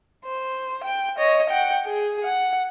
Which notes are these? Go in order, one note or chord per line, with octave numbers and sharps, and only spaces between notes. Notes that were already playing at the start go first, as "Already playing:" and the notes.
C5
G5
C#5 D#5
F#5 G5
G#4
F#5